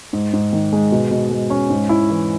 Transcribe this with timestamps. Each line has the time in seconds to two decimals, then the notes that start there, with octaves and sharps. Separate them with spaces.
0.13 G#2
0.33 G#2
0.53 D#3
0.73 G#3
0.92 B2
1.11 B2
1.31 G#3
1.50 C#4
1.70 G#2
1.89 E4
2.10 E3